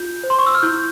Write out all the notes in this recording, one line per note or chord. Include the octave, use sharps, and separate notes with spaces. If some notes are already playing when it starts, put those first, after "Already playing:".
Already playing: F4 G6
C5
C6
C#6
E6
F6
E4 G6